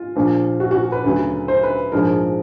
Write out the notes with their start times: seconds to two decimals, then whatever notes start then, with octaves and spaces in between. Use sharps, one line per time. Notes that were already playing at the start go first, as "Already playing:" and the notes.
Already playing: F4
0.16 A#1 A#2 F3
0.60 F#4
0.71 F#4
0.92 B4
1.04 D2 C#3 F#3
1.48 C5
1.63 B4
1.92 A#1 G#2 F3 G#3 A#4